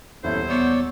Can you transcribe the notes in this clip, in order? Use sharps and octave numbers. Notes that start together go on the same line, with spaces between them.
D#1 E2 C#4 E4 A4 C5 E5
B3 C#5 D5 E6